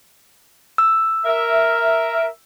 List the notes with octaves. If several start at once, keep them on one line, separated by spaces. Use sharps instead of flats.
E6
A#4 E5